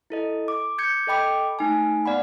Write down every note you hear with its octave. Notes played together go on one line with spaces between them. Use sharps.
E4 A4 D#5
D6
D6 G6 G#6 C#7
A4 D#5 G5 B5 D6
A3 D#4 G#5
B3 D5 F#5 B5